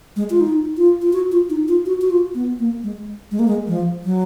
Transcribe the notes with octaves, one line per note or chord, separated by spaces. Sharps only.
G#3
F4
D#4
F4
F4
F#4
F4
D#4
F4
F#4
F#4
F4
B3
A#3
G#3
G#3
A#3
G#3
F3
F#3